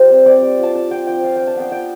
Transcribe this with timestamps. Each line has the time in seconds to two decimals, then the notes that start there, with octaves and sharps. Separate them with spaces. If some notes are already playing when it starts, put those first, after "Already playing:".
Already playing: G3 F4 C5
0.10 C4
0.26 C4 D5
0.42 G3
0.59 F4 A5
0.75 D4 A5
0.91 F4 G5
1.07 F3 G5
1.23 F4 F5
1.36 D4 G5
1.47 A5
1.56 B3 G5
1.72 F4 G5